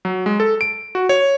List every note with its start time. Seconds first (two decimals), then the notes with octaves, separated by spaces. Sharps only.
0.05 F#3
0.26 G#3
0.40 A4
0.61 D7
0.95 F#4
1.09 C#5